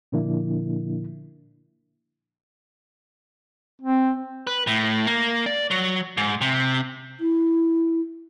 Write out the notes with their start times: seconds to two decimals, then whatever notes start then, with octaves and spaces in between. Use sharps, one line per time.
0.12 A#2 D3 F3 A#3 D4 E4
3.82 C4
4.47 B4
4.67 A2
5.07 A#3
5.46 D5
5.71 F#3
6.17 G#2
6.41 C3
7.20 E4